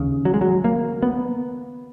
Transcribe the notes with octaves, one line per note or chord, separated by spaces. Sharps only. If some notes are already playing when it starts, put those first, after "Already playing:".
Already playing: D#2 C#3
F#3
G#3
F#3
A#3
B3